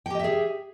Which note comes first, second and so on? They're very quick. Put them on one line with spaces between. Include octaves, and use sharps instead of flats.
G5 G4 D#5 E5 G#4